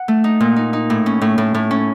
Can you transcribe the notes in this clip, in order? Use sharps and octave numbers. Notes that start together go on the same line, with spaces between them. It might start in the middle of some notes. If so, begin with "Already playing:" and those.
Already playing: F#5
A3
D#4
A#2
D#4
D#4
A2
C#4
A2
A2
A2
C#4